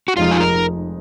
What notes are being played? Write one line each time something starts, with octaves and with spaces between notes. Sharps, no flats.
F#4
F1 F2 F3 G#3 D#4 F4
G#4
A#4